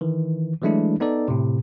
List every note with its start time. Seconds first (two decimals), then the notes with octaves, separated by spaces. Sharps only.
0.01 D#3 E3
0.62 E3 F#3 G#3 A3 D4 E4
1.00 B3 D#4 A4 D5
1.28 A2 C3